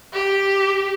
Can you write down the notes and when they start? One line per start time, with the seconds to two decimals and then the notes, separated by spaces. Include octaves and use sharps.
0.13 G4